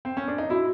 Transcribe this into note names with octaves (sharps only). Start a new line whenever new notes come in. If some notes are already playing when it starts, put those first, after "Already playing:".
C4
C#4
D4
D#4
E4 F#4